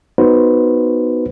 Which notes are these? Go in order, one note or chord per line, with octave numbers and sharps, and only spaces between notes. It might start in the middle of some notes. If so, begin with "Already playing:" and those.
B3 D#4 F#4 B4 C5